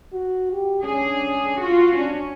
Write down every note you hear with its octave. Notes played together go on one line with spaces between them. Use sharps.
F#4
G4
C#4 D4 G#4
F4 F#4
C#4 D4